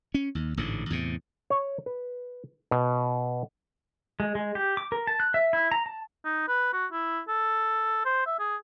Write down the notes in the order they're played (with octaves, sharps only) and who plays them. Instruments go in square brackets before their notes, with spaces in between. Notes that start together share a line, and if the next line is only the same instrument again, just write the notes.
[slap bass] C#4
D#2
A1 G#2 D3
E2 A2 C3
[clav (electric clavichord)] C#5
B4
B2
[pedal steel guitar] G#3
G#3
G4
D6
A#4
A5
F#6
E5
E4
A#5
A5
[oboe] D#4
B4
F#4
E4
A4
C5
E5
G#4